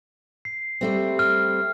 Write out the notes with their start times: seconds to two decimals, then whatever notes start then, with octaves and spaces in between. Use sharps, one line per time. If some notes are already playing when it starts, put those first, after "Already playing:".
0.45 C7
0.81 G3 A3 C4
1.19 F6